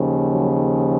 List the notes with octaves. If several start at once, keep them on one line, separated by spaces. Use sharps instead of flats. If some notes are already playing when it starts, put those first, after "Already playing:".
Already playing: D#2 C#3 F3
F#3